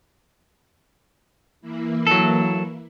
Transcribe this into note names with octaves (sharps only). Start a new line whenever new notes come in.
E3 A#3 E4
F#3 A4